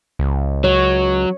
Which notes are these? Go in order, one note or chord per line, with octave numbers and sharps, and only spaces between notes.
C#2
F#3 C#5